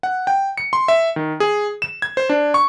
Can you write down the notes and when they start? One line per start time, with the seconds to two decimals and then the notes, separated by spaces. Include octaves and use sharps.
0.03 F#5
0.27 G5
0.58 C#7
0.73 C6
0.88 E5
1.16 D#3
1.40 G#4
1.82 E7
2.02 G#6
2.17 C5
2.29 D4
2.54 C#6